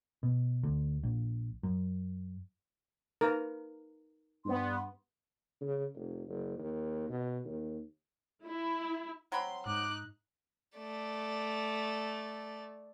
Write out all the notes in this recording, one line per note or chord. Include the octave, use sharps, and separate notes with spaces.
B2
D2
A#1
F#2
D#4 A#4 B4 F5
G2 B3 C6
C#3
F1
F#1
D#2
B2
D#2
E4
F#3 C4 B5 C6
G#2 D#4 D6 F#6
A3 D5